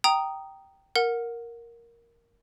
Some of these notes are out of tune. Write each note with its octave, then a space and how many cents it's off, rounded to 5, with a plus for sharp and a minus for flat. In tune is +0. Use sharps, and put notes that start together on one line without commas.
G5 -10 A#5 +0 D#6 -5
A#4 +0 F#5 -20